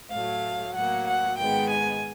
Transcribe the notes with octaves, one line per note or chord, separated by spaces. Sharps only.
A2 F#3 A3 F5
A2 F#3 A#3 F#5
F#5
G#2 D#3 G#3 B3 G5
G#5